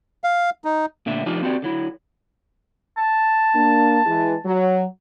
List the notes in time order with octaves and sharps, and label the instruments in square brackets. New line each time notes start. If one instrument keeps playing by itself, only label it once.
[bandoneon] F5
D#4
[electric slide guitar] A#2 D3 A3 E5
F3 D4 D#4 F4 G4
C4 F#4 G4 D5
D3 F#3 E4
[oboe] A5
[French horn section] A#3 D4
E3 G#3
F#3